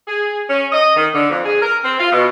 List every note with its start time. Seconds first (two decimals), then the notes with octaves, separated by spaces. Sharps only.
0.07 G#4
0.50 C#4
0.72 D#5
0.96 D#3
1.13 D3
1.30 F2
1.45 G#4
1.62 A#4
1.84 C4
1.99 F4
2.12 B2